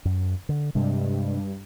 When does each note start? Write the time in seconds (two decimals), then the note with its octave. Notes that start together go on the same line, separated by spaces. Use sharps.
0.05 F#2
0.49 D3
0.75 G2 C3 G#3 D4